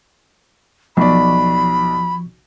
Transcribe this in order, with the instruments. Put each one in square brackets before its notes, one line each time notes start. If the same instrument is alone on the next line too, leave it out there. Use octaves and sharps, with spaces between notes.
[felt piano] B1 D5 [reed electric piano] F3 C#6 [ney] B5